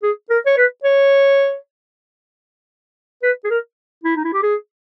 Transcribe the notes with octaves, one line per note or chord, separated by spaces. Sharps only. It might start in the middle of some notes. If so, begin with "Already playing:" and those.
G#4
A#4
C#5
B4
C#5
B4
G#4
A#4
E4
D#4
E4
G4
G#4